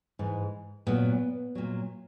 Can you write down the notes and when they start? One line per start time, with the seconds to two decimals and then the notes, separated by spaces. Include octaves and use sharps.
0.19 G#2 E3
0.87 A#2 F#3 B3
1.55 A#2 F#3